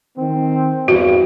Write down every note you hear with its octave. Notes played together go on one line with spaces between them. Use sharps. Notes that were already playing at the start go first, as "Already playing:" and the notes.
D#3 C4
E2 G2 F#4